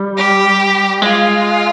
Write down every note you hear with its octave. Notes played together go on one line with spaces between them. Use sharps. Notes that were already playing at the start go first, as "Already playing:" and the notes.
Already playing: G3
G4
G#3 F4